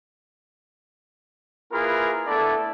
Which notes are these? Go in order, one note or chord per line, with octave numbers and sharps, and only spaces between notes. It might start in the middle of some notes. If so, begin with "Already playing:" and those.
A#3 E4 F4 G#4 A#4 B4
A3 B3 D4 E4 A4 D5